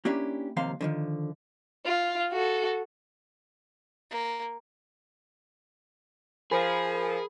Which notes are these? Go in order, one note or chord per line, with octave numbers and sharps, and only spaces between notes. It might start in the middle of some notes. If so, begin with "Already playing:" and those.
A#3 C#4 D4 E4 G4
D#2 C3 F3 A#3 F5 C6
D3 D#3 F3
F4
F#4 A4
A#3
F3 G#4 A#4 G#5 B5